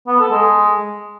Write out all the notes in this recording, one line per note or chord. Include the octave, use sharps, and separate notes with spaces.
B3
A4
G#3